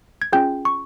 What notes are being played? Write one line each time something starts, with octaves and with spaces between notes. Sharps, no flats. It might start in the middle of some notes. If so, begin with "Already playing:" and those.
G#6
C#4 F4 G#4 G5 G6
C#6